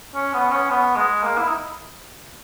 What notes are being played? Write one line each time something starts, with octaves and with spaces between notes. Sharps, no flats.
C#4
B3
C#4
B3
G#3
A#3
E4
D#4